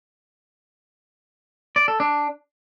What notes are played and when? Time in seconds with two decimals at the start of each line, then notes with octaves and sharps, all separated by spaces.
1.76 D5
1.88 A4
2.00 D4